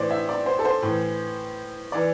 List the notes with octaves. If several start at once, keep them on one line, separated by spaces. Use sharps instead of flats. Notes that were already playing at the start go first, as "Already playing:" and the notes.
Already playing: A2 E3 C5 D5
E5
D5
C5
A4
C5
A2 E3
E3 D5